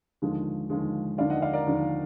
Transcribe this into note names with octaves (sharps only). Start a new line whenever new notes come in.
D#2 D3 F3 G#3
D#2 D3 F3 G#3
D#2 D3 F3 D5 F5
D#5 F#5
D5 F5
A#4 D5
D#2 D3 F3